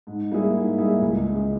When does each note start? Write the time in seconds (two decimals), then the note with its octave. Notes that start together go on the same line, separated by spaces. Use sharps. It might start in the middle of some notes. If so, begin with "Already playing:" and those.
0.07 G#2
0.31 G3 A#3 E4 G#4
0.54 G#2
0.78 G3 A#3 E4 G#4
1.02 C#2
1.26 C#3 G#3